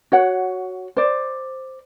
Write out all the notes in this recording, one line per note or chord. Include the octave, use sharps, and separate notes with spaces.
F#4 C#5 F#5
C5 D5